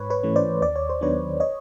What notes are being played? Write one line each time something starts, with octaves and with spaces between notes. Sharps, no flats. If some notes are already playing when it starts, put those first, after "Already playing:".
Already playing: G#2 B4 C#5
B4 C#5
E3 A3 C#4
C5 D5
D#2 D5
C#5
C5
D#3 F#3 B3 D4 B4 C#5
C#5 D#5